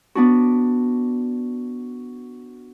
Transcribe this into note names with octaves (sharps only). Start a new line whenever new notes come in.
B3 D4 F#4